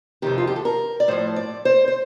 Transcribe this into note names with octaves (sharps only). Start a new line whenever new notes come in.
F2 C3 D#3 G4
F4
G4
A4
A#4
D5
A2 F3 C5
D5
C5
C5